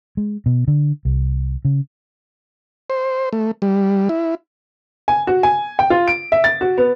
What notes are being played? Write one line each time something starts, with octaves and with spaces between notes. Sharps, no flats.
G#3
B2
D3
C2
C#3
C5
A3
G3
E4
G#5
F#4
G#5
G5
F4
D7
E5
A6
F#4
B3